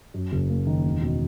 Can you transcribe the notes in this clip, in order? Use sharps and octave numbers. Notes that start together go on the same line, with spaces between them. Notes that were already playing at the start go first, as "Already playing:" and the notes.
F#2
F#1
A#3
D#3
E1
B2